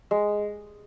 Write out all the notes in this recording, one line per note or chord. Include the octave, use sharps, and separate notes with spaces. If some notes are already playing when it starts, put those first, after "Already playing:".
G#3